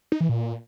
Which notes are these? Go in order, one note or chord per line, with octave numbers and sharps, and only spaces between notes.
D#4
E3
A#2